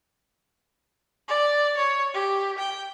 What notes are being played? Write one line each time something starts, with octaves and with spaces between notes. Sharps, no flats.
D5
C#5
G4
G5